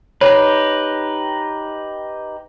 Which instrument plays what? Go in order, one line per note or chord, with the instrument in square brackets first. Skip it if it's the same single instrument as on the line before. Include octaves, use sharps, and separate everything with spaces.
[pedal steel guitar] D#4 G4 B4 [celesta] C#5